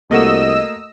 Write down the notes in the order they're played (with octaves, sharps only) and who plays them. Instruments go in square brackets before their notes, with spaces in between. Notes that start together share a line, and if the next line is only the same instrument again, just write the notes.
[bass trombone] C2 [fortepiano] A3 A#3 F#4 [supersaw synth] D#5 E6